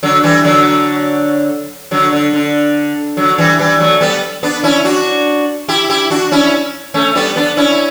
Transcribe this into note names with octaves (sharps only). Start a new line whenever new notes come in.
D3 F#3
E3 G3
D3 F#3
D3 F#3
D3
D3
D3 F#3
E3 G3
E3 G3
F#3 A3
G3 B3
B3 D4
C#4 E4
D4 F#4
E4 G4
E4 G4
D4 F#4
C#4 E4
A3 C#4
G3 B3
B3 D4
C#4 E4